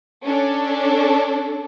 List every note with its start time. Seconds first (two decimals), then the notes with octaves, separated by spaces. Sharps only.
0.25 C#4 D4 A4